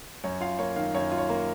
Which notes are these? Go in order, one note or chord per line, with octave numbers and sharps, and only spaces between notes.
F#2 C#5
F4 F5
A#3 C#5
D#3 F5
F#2 C#5
F4
C#5
A#3